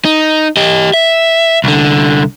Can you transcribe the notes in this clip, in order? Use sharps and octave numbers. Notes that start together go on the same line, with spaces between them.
D#4
G4 D#5
E5
C2 D3